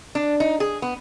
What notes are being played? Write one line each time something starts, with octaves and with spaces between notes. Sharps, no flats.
D4
D#4
G#4
B3